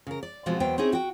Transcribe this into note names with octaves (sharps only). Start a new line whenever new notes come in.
C#3 A#4
D5
B2 F3 G#3 C4 F4 F#4
E2 F#3 A#3 B3 C5 G5
C4 C#4 D#4 E4 G#4
F#4 G5